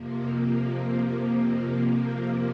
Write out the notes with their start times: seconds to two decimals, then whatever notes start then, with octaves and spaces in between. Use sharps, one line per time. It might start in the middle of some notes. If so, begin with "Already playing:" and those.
Already playing: F2 C3 F3 A#3
0.49 A#3
1.06 F2 C3 F3